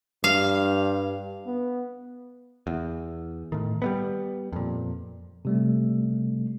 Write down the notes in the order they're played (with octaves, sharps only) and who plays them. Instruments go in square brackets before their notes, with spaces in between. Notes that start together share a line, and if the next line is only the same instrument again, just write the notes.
[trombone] G2 [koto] F5
[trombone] B3
[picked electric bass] E2
A2 D#3
G3 A3 B3
F2 A#2
[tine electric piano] C3 G3 A3